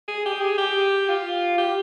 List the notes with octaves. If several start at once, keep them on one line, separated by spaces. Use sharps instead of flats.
G#4
G4
G#4
G4
F4
G4